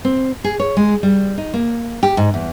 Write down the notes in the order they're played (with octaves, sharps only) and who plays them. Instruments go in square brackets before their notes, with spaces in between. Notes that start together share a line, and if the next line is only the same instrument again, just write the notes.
[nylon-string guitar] C4
G#4
C#5
G#3
G3
D#4
A#3
G4
G#2
E2